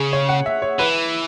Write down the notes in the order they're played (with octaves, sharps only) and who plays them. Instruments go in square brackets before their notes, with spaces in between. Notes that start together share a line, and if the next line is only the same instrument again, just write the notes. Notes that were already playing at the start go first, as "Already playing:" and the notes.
Already playing: [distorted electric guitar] C#3 [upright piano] G#4
[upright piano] C#5
F#5
E5
C#5
[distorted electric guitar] E3 [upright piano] B4